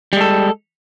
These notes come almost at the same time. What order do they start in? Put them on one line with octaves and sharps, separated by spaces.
G3 G#3 A4